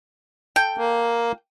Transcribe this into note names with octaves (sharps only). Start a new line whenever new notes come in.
A4 G5
A#3